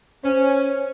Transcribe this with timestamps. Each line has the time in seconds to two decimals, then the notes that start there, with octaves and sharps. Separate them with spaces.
0.24 C#4 C5